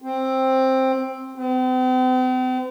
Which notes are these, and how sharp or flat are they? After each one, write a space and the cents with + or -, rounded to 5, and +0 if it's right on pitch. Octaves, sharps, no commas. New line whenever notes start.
C4 +10
C4 -45